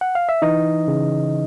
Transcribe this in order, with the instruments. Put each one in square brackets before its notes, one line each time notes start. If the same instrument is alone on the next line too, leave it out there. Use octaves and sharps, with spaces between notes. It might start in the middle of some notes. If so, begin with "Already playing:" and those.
[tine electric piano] F#5
F5
E5
E3 D#4 D#5
C#3